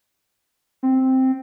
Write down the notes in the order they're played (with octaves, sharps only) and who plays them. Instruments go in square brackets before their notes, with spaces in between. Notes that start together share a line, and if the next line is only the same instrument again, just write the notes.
[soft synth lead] C4